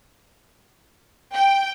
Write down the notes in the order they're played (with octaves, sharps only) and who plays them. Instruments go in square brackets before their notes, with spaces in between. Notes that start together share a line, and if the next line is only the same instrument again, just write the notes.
[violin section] G5